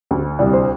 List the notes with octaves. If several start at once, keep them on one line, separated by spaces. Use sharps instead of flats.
D2
C2 D5
C5